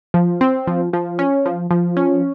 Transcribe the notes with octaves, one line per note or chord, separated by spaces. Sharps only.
F3
C4
F3
F3
C#4
F3
F3
C#4